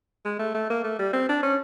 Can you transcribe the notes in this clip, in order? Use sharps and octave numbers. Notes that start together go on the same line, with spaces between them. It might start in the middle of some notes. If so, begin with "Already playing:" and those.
G#3
A3
A3
A#3
A3
G3
C4
D4
C#4